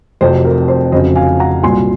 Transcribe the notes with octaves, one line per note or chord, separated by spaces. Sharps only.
F1 F2 C3 F#3 C5
A#4
C5
F1 F2 C#3 F#3 C5 D#5
F5 G#5
F#5 A#5
C2 A#2 F#3 G#5 C6